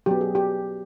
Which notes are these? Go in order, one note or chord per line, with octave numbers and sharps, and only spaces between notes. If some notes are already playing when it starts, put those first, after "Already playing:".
F#3 B3 G4
G#4
G4